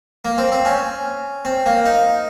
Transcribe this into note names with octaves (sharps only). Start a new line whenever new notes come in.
A#3
C4
C4
C#4
C4
A#3
D#4